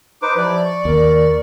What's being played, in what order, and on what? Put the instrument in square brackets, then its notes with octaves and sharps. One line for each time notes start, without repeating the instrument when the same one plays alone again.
[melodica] D#4 B4 C5 [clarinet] D6
[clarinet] F3 [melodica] E4 G4 [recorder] D5
[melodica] C#6
[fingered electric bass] D#2 [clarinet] A#4